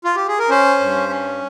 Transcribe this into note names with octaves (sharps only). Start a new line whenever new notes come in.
F4
G4
G#4
A#4
C#4 C5
G2
C#4